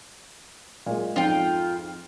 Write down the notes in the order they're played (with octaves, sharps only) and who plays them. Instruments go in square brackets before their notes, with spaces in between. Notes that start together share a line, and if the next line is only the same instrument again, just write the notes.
[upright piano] A#2 G#3
[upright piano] F2 G#2 [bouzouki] F4 G5